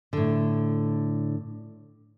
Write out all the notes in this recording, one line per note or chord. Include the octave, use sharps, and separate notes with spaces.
A2 D3